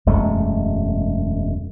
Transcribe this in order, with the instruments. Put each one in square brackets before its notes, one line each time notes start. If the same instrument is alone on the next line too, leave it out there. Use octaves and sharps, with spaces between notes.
[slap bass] E1 F#2 G#3 A3